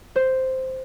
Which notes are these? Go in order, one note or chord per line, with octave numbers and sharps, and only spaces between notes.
C5